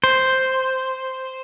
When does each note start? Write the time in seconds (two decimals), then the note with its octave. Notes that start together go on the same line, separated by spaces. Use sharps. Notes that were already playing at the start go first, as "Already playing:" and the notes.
0.04 C5